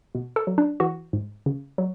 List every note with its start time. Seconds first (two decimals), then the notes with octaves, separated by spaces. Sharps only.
0.15 B2
0.36 A4
0.47 F#3
0.58 D4
0.80 E3 F#4
1.13 G#2
1.46 C#3
1.78 F#3